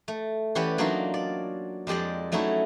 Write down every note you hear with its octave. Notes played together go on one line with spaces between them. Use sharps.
A3
E3 C#4 G4 B4 D5 F#5
F#3 A#3 D4 D#4 F4 F#4
D5
F2 G#3 G4 D5 D#5
F#3 A3 C#4 D#4 E4 F#4